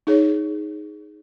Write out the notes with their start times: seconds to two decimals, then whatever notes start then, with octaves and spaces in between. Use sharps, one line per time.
0.07 D#4 G#4 C#5